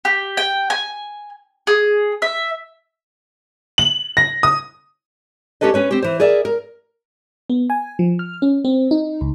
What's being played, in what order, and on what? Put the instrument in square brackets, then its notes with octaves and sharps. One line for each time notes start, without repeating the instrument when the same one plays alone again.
[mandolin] G4
G5
G#5
G#4
E5
[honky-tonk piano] F#7
A#6
D#6
[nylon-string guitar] C#4 G4 A4 B4 D#5
C#4 B4 C#5
C4 G4
E3 C5
G#4 A#4 D5 E5
A#4
[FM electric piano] B3
G#5
F3
F6
C#4
C4
D#4
C#2